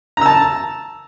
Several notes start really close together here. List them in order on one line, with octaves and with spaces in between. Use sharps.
A#5 E6 A5